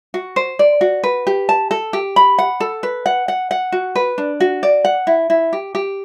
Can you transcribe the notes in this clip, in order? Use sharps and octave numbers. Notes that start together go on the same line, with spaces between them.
F#4
C5
D5
F#4
B4
G4
A5
A4
G4
B5
F#5
A4
B4
F#5
F#5
F#5
F#4
B4
D4
F#4
D5
F#5
E4
E4
G4
G4